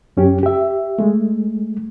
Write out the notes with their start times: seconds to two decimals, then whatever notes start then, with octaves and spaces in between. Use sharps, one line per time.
0.17 F#2 C#4 G4
0.43 G4 E5
0.99 G#3 A3